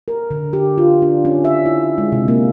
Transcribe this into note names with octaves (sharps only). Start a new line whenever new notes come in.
A#4
D3
G4
F4
D4
C#4
E5
E4
G#3
C3
A#3